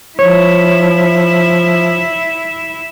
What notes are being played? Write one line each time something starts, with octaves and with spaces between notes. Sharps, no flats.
F3 E4 C#5 E5